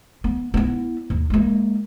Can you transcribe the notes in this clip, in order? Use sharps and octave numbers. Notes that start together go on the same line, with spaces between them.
B3
B3 E4
D#2
G#3 A#3